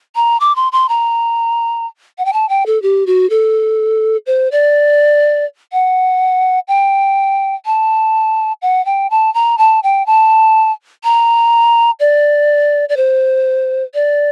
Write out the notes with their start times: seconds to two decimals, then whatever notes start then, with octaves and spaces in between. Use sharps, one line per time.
0.16 A#5
0.40 D6
0.56 C6
0.72 C6
0.89 A#5
2.18 F#5
2.25 G5
2.33 A5
2.49 G5
2.66 A4
2.82 G4
3.07 F#4
3.30 A4
4.27 C5
4.52 D5
5.73 F#5
6.68 G5
7.66 A5
8.62 F#5
8.86 G5
9.11 A5
9.34 A#5
9.58 A5
9.83 G5
10.06 A5
11.04 A#5
12.00 D5
12.89 D5
12.97 C5
13.94 D5